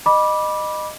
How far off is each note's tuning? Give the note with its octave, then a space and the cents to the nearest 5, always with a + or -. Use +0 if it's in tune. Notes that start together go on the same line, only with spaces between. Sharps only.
D#5 -20 B5 -15 D6 +0